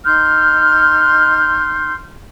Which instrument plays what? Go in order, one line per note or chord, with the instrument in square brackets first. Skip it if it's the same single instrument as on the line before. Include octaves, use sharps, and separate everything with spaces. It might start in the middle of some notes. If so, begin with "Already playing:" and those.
[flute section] D#4 C6 F6 G6